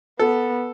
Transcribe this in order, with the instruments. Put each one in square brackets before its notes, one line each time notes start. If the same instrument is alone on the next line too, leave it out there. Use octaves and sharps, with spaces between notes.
[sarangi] B3 [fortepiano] A4